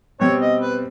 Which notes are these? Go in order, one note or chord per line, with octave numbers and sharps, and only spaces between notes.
B2 G3 C4 C#5
D#5
B4